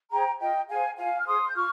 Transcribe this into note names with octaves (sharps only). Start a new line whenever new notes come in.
G#4 C5 G5 A#5
F4 D#5 G5
G#4 C5 F5 G#5
F4 F5 G#5
F6
G#4 C5 C6 D#6
G6
F4 C#6 F6